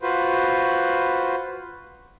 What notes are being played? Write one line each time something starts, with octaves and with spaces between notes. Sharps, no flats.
F4 F#4 B4 C5